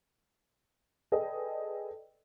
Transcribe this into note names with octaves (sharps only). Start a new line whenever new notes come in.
G#4 A4 B4 D5 D#5 G5